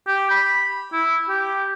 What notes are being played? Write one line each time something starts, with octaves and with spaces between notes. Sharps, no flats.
G4
B5
E4
G4